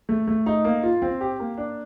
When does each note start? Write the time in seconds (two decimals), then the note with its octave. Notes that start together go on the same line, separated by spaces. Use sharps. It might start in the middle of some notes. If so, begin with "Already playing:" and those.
0.09 A3
0.27 A3
0.46 D#4
0.65 A#3
0.83 F4
1.02 C4
1.21 G4
1.40 A#3
1.58 D4